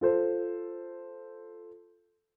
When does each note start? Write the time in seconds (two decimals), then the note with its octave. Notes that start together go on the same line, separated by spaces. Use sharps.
0.01 F4 A4 C5